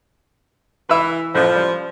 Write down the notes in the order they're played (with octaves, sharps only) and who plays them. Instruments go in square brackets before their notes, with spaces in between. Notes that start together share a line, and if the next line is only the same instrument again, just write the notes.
[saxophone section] E3 [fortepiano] B4 E5
[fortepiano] A1 [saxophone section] F3
[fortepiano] G3